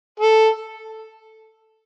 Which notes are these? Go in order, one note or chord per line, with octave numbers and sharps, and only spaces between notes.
A4